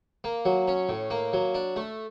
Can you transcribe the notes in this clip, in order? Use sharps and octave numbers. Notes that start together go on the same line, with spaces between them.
A#3
F#3
C#4
A2
A#3
F#3
D4
A3